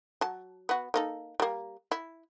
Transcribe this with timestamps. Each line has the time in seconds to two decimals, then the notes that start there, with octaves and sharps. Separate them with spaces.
0.21 F#3 A5
0.69 B3 F#4
0.94 A#3 D#4 A4
1.40 G3 A#3
1.92 E4